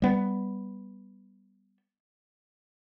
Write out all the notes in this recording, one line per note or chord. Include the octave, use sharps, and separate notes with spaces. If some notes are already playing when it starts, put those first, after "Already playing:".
G3 B3